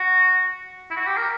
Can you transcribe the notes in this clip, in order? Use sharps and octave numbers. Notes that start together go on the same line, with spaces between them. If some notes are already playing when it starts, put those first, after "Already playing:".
Already playing: F#4
E4
F#4
G4
A#4